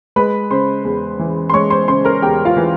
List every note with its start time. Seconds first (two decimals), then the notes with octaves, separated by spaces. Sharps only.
0.16 G#3 B4 B5
0.51 C#3 C5 C6
0.85 E2
1.19 E3
1.50 C6
1.53 G#3 C#5 C#6
1.70 C5 C6
1.88 C#3 C5 C6
2.05 A#4 A#5
2.22 E2 G4 G5
2.45 F4 F5
2.57 E3